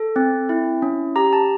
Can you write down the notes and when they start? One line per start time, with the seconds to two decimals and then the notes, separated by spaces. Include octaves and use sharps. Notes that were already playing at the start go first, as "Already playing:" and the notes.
Already playing: A4
0.16 C4
0.49 E4
0.82 C#4
1.16 G4 A#5
1.33 A5